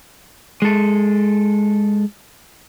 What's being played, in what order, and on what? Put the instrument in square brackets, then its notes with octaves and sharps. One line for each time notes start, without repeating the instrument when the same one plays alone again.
[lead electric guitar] G#3 A4